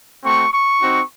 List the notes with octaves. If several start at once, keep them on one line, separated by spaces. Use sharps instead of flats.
A3 C4 F#4 C#6
C#6
C4 D#4 F#4